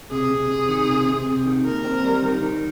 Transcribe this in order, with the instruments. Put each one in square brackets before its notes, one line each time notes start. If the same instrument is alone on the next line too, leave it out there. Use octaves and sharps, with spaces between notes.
[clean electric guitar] C3 [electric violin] G#4
[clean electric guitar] C3
C3
D#3
C3
C3
C3
D#3
[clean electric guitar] D#2 [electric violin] A#4
[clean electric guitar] C4
G3
D#3
D#3